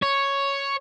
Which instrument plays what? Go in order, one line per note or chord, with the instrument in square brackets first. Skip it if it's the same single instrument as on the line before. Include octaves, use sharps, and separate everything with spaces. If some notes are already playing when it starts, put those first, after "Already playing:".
[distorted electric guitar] C#5